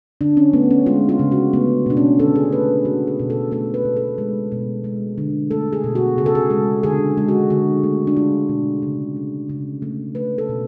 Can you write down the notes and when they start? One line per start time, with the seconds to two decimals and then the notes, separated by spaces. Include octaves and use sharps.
0.21 D3 D4
0.37 C#4
0.53 A3 B3
0.71 C#4
0.86 G#3 F4
1.09 F4
1.19 C#3
1.32 F#4
1.53 A3 B3
1.86 B2 D4
1.97 C#4
2.20 D3 A4
2.36 G#4
2.52 A3 B4
2.85 A3 F#4
3.07 G#4
3.20 B2
3.30 A4
3.51 A3 A4
3.74 B4
3.85 B2
3.96 A4
4.18 G#3
4.52 B2
4.84 G#3
5.18 D3
5.51 A3 A4
5.73 G#4
5.84 B2
5.95 F#4
6.17 C#3 G#4
6.26 A4
6.35 G#4
6.50 G#3
6.83 D3 G#4
7.18 G#3
7.28 F#4
7.50 D3 F#4
7.84 A3
8.07 D4
8.16 G#3 F4
8.49 B2
8.82 C#3
9.16 A3
9.49 C#3
9.82 A3
10.15 A3 B4
10.38 A4
10.49 B2